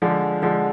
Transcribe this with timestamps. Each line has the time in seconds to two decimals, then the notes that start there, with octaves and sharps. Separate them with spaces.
0.02 D3 F3 G#3
0.42 D3 F3 G#3